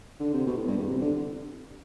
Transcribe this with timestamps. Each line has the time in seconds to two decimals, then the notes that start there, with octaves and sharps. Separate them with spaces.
0.20 D3
0.33 C3
0.47 B2
0.57 A2
0.67 G2
0.77 E2
0.88 C3
1.01 D3